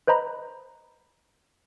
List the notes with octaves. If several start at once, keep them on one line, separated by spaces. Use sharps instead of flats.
B4 C5 D#5 A#5 B5